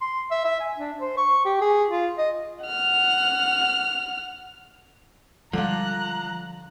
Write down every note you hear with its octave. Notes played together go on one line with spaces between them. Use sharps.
C6
E5
E5
G#5
D4
C5
C#6
G4
G#4
F4
D#5
F#5 F6
D3 F3 G3 G#3 D4 F4 A#5 F#6